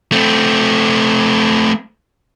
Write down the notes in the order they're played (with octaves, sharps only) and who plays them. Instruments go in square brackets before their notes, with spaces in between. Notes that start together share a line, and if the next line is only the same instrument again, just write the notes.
[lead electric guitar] A3 C4